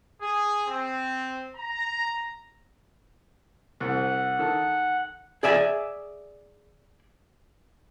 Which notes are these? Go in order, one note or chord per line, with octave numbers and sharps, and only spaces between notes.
G#4
C4
A#5
C2 F#5
D#3 A4
G#4 D5 E5 G#5